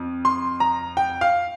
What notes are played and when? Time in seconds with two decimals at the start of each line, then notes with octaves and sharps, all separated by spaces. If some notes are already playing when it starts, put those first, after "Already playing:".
Already playing: F2
0.25 C6
0.60 A#5
0.97 G5
1.21 F5